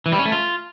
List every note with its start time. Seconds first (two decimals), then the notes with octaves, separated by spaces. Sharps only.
0.06 E3
0.12 G3
0.19 C#4
0.26 A3
0.32 F4